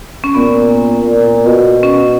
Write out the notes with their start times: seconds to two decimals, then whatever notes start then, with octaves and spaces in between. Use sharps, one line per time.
0.24 C#4
0.35 A#2 B3
1.09 A#2
1.46 B2
1.83 C#4